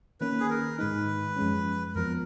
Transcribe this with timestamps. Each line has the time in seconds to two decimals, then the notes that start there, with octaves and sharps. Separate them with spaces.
0.21 D#3 A#3 C#4 B4
0.40 G#4
0.50 A#4
0.79 G#2 D#3 G#3 D#4 B4
1.36 F#2 F3 G#3 C#4
1.95 F2 F3 B3 A#4